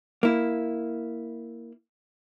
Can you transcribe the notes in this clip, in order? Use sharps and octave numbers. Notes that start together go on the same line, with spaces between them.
A#3 E4